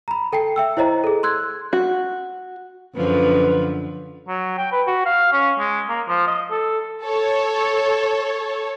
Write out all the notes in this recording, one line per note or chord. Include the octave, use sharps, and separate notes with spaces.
A#5 B5
A4 G5 A5 C7
E5 G5 E6
E4 C5 C#5 D#5 A#5
G#4 A4
C6 E6 F#6 G#6
F#4
F#2 D3 F3 B4
F#3
G5
B4
F#4
F5
C#4
G#3
A#3
F3
D#5
A4
A4 C#5